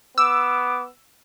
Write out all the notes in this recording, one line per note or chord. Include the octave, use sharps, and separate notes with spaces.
B3 D6 E6